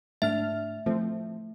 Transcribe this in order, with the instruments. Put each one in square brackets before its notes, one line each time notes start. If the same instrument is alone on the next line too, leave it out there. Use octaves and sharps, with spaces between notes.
[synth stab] G#2 D4 F6 [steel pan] A3 [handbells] E5
[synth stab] F3 C4 [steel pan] A3